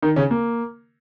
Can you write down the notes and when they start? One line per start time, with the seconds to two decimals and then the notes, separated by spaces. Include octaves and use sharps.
0.02 D#3 D#4
0.16 C#3 C#4
0.31 A#3